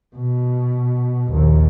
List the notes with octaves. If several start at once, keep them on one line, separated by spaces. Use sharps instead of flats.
B2
A#1 D#2